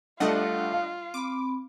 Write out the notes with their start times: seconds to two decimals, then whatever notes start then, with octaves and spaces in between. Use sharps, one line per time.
0.20 G3 A3 D4 F4 D#5 F#5
0.72 F5
1.14 C4 B5 D6